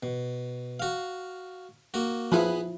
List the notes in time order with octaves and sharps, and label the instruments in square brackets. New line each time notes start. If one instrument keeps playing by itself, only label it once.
[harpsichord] B2
F#4 F5
A#3 F#4
[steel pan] F3 E4 [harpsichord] B3 G#4 B4